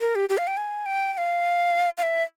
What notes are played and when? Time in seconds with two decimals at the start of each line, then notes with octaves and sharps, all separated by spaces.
0.01 A#4
0.15 G4
0.29 G4
0.38 F5
0.47 G5
0.57 G#5
0.86 G5
1.13 G5
1.18 F5
1.98 F5
2.03 E5